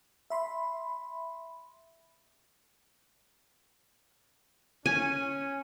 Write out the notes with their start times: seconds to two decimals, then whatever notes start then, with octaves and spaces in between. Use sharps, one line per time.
0.30 E5 B5 C6
4.86 C#4 G#5